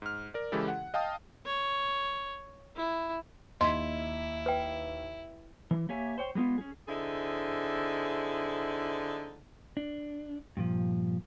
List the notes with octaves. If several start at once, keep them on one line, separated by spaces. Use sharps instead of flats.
G#2 F6
A#4 D5
C#3 E3 G#3 E4 G4 A4
F#5
D#5 F5 G5 A5 D#6
C#5
E4
D#2 E4 D#5 C6 G#6 B6
B4 G5
E3
A#3 G4 C#5 E5 G#5
C5 C#5 G5
G3 G#3 B3 F4
C#4 G#4
D3 C4 D#4 E4 G#4
D4
G2 A#2 F3